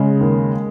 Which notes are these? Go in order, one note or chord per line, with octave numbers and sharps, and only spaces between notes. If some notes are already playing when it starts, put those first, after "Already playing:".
Already playing: C#3 G#3
D#2